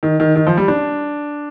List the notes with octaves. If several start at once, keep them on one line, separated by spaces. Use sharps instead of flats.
D#3
D#3
D#3
F3
G3
D4